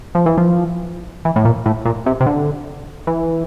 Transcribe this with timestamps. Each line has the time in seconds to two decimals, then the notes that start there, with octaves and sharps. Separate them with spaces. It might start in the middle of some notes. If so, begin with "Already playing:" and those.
0.15 F3
0.26 E3
0.38 F3
1.25 E3
1.36 A2
1.45 A#2
1.66 A2
1.85 A#2
2.06 C3
2.21 C3
2.26 D3
3.07 E3